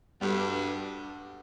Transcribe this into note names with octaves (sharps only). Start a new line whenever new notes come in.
G2 G3 B3 D4 F#4 A4